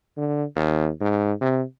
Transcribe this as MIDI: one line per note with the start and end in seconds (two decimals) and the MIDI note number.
0.17 0.44 50
0.56 0.89 39
1.01 1.33 44
1.41 1.63 48